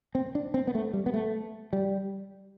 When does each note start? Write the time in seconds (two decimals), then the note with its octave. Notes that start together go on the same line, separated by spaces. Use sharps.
0.15 C4
0.35 D4
0.54 C4
0.67 B3
0.75 A3
0.93 G3
1.06 B3
1.14 A3
1.73 G3